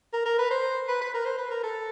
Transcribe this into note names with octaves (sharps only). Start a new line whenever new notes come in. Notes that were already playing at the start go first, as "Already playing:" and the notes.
A#4
A#4
B4
C5
B4
B4
A#4
C5
B4
A#4
A4